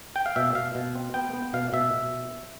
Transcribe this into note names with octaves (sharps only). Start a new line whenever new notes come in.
G5
F5
B2 E5
B2 F5
B2
C4
B3 G5
B3
B2 F5
B2 E5
B2